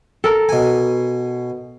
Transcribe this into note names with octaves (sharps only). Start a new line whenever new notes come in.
A4 A#4
B2 G#5